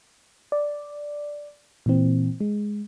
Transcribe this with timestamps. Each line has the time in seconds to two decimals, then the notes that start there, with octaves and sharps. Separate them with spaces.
0.52 D5
1.86 A#2 E3 C4
2.40 G#3